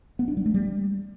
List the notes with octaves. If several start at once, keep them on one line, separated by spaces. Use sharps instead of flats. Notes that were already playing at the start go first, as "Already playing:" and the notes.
B3
D4
G3
A3
G3